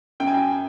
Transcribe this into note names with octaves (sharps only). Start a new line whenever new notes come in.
F#2 G5
G#5
G5